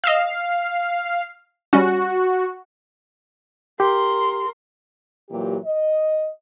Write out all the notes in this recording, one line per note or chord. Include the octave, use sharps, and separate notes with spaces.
D#5 F5 E6 F6
G3 C#4 F#4
G4 A#4 C6
A#2 E3 F#3 G4
D#5